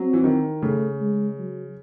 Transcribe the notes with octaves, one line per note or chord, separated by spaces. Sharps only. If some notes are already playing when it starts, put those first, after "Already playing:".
Already playing: F#3 C4
E3
D#3
C#3 A3
G#3
F#3